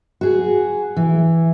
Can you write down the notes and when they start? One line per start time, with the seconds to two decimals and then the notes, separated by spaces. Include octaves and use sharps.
0.21 F#4 G#4
0.97 E3